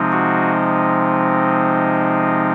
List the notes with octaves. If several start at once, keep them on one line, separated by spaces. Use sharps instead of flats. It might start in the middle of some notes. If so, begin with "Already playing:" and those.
Already playing: C3 F3 G#3 C4 D#4
F#4